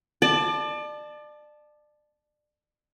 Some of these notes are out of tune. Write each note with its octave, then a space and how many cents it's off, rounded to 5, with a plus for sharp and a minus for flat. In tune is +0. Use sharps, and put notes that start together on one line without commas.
D5 +30 A5 -10